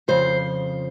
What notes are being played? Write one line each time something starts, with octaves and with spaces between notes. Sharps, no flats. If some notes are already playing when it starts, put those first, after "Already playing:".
F2 C#3 F3 C5